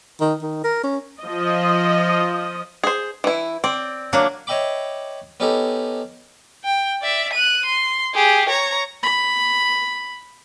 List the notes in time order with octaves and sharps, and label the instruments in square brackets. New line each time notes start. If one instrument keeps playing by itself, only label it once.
[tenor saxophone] D#3
D#3
A#4
C#4
[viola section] F3 D#5
[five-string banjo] G#4 C5
E3 E4
[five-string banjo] C4 [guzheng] D5
[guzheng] F#3 A#3 D4
[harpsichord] C#5 D#5 E5 G5 B5 D6
B3 C#4 D#4 G4 A4
[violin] G5
D5 E5
F#6 D#7
C6
G4 G#4
C#5 A#5
[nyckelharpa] B5